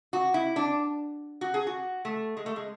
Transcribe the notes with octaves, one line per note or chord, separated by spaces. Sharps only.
F#4
E4
D4
F#4
G#4
F#4
A3
G#3
A3
G#3